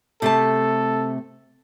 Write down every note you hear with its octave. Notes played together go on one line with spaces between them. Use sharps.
C3 A3 A4 A5